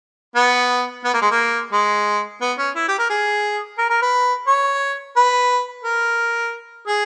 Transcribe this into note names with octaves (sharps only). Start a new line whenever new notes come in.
B3
B3
A#3
G#3
A#3
G#3
B3
C#4
E4
G4
A#4
G#4
A#4
A#4
B4
C#5
B4
A#4
G#4